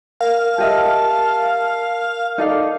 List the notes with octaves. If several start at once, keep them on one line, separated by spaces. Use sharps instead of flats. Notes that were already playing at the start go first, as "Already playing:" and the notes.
A#4 F5
G4 D#5 E5 A5
D#4 A4 D5 F5